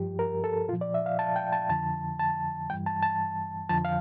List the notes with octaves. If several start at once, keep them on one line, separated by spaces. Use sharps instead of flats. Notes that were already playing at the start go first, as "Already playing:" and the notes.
Already playing: G2 F3 G4
A#4
A4
A#2 F3 F4
D5
E5
F5
A5
G5
A5
F2 D3 F3 A5
A5
G2 E3 G3 G5
A5
A5
F2 D3 F3 A5
F5